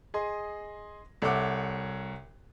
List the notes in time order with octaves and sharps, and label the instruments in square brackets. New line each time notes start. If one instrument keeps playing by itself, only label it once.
[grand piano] G#4 D#5 C6
C2 A4 C#5 E5 F#5 D6